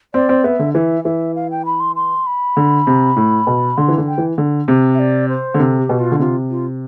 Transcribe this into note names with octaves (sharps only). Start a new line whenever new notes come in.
C4 D5
C4
B3 E5
D3
E3 E5
E3 E5
F5
G5
B5
C6
C6
B5
D3
C3
A2
B2
D3 C6
E3
D3
G5
E3
D3
C3
E5
D5
C5
D3
C3 A4
G4
B2
F4
D3
C3 F4
F4